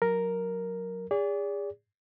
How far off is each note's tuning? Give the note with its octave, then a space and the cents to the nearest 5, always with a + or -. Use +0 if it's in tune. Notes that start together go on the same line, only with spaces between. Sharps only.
F#3 -10 A#4 +0
G#4 -35 D5 -35